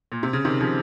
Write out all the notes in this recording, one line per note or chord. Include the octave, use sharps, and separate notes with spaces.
A#2
C3
C#3
C3 D#3
C#3 F3